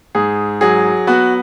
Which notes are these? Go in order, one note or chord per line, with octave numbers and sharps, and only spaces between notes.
G#2 G#4
F#3 G#4
B3 F#4